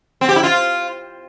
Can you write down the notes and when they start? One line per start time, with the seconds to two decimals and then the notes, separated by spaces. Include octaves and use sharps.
0.21 C4
0.29 G4
0.36 E4
0.43 F4